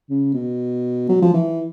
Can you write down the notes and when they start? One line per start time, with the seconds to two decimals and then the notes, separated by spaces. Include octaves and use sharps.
0.09 C#3
0.34 B2
1.09 F#3
1.22 F3
1.33 E3